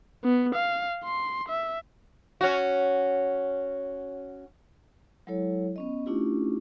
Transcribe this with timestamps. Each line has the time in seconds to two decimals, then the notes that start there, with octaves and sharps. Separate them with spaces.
0.24 B3
0.55 F5
1.04 C6
1.49 E5
2.41 C#4 F#4
5.27 F#3 G#3 E4 A4 C#5
5.76 B3 C#4 D#5
6.06 A3 C#4 D4 E4 F4 G4